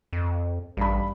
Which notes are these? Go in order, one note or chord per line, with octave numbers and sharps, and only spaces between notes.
F2
A1 G2 B5